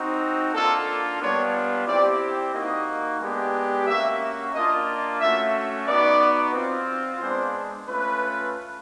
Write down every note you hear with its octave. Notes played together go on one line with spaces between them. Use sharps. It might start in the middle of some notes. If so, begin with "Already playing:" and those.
Already playing: C4 D#4 F#4
A#3 D4 F4 A4
G3 B3 D4 F4 C#5
C4 E4 G4 D5
A#3 D#4 F#4 D#5
G#3 B3 D4 G4
A#3 C#4 F#4 E5
A#3 D4 F4 D#5
A3 C#4 F#4 E5
B3 D#4 F#4 D5
C4 F4
G#3 B3 D4 C5
A3 C#4 F4 B4